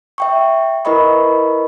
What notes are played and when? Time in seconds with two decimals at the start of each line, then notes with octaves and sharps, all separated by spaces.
0.18 E5 G5 C#6
0.85 E4 A#4 B4 D#5 B5 C#6